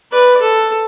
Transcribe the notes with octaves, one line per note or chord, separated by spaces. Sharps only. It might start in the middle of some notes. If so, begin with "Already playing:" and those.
B4 D5
A4